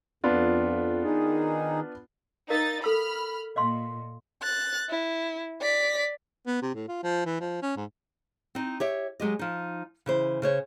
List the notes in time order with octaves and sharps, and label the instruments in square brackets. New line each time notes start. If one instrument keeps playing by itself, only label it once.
[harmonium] F2 [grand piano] B3 D4 F4
[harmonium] D#3 D#4 G#4
[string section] D#4 A6 [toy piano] A#4 F5
[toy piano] A4 E6 [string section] B5 F6
[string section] A#2 [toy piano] D#5 F5 C6
[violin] F#6 A6
E4
D5 B6
[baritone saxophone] B3
C3
A2
F4
F3
E3
F3
C#4
G#2
[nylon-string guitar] C4 D#4
G4 C#5 E5
F#3 G#3 G4 D#5
F3 D#4
C#3 E3 C5
C#3 C5 C#5